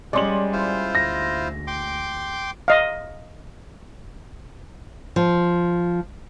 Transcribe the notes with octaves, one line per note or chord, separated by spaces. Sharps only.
G3 G#3 C#4 D5 C6 F#7
E4 F4 C5
D2 A#6
G5 C6 D6
D#5 F5
F3